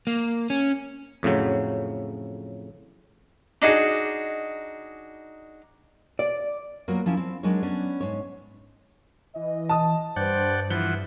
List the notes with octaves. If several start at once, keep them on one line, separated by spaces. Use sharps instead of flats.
A#3
C#4
F2 A2 C#3 F#3
D4 D#4 F#4 G#4
D5
F#3 A#3 B3 F4 F#4 A#4
F3 C#4 E4
C4
F#3 G#3 D4 D#4 A#4 C#5
B3 C#4 D4
G#2 C#5
E3 D#5
A5 D#6
G2 B4 C5 D5 F#5 G5
E3 F3 E4 F#5 G7